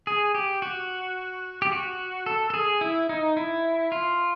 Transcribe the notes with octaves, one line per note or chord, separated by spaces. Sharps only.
G#4
G4
F#4
G4
F#4
A4
A4
G#4
E4
D#4
E4
F4